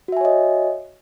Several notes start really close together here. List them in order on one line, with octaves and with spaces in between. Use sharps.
F#4 E5 G#5 C#5 D#5